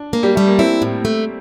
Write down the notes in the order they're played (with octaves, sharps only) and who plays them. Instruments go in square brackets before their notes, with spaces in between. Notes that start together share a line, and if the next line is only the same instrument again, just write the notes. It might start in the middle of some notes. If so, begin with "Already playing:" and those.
Already playing: [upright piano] D4
[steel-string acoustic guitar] A#3
[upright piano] G3
[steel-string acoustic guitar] G3 [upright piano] A3
[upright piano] A#3
[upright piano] C4 [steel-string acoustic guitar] E4
[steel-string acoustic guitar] A2
A3